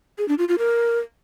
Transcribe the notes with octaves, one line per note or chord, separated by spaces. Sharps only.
G#4
D4
F4
F4
A#4